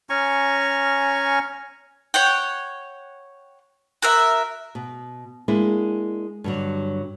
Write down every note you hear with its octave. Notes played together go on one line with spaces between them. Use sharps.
C#4 G#5 A#5 C#6
C#5 F#5 G5
F#4 A#4 E5
B2
G#3 A#3 D4 E4
G2 D3 F#3